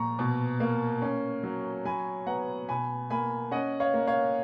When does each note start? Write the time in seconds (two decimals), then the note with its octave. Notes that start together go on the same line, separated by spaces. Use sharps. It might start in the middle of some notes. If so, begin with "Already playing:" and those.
Already playing: A#2 F3 A#5 C#6
0.19 B2
0.60 A#3
1.02 C#4
1.43 F#3
1.85 F#3 G#5 B5
2.27 B3 F#5 A#5
2.69 B2 G#5 B5
3.10 A#3 G#5 B5
3.51 C#4 D#5 F#5
3.80 C#5 F5
3.94 A#3
4.07 C#5 F5